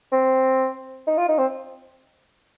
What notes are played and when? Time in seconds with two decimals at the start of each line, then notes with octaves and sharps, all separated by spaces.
0.12 C4
1.07 D#4
1.18 F4
1.29 D#4
1.38 C4